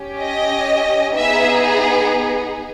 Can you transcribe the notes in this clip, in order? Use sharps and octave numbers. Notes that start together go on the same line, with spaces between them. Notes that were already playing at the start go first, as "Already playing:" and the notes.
Already playing: C#4 G4
D#5
B3 D#4 G#4 E5